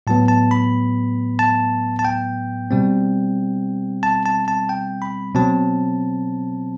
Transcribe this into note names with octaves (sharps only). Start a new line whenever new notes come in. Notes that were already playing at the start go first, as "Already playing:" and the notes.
A2 F#3 B3 A5
A5
B5
A5
A5
G5
B2 G3 C4
A5
A5
A5
G5
B5
B2 F#3 C4 A5